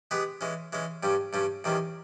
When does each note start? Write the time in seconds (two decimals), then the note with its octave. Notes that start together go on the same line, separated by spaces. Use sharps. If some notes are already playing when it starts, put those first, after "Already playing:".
0.11 G#3 B3 G4 B4
0.41 E3 G#3 C#4
0.73 E3 G#3 C#4
1.03 G2 G3 C#4
1.33 G2 G3 C#4
1.64 E2 D#3 G3 C#4